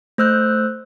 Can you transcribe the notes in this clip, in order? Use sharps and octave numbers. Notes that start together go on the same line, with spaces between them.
A3 C5 E6 F#6 G6